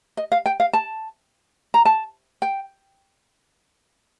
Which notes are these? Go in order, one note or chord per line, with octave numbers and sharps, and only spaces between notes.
D#5
F5
G5
F5
A5
A#5
A5
G5